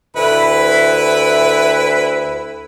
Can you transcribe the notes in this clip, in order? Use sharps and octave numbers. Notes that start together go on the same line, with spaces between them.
D2 E4 B4